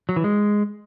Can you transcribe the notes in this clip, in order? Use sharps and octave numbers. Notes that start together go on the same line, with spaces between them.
F#3
E3
G#3